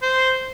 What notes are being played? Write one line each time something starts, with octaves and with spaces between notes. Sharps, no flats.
C5